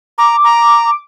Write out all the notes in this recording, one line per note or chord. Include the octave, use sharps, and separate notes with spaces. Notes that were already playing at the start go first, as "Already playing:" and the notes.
A#5 D6
A#5